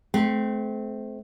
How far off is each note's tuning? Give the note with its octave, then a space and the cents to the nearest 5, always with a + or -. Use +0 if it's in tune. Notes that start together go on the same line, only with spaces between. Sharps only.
A3 -35 C4 -15